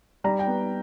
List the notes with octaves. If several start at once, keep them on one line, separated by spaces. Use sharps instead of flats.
G3 A#5
G5
B3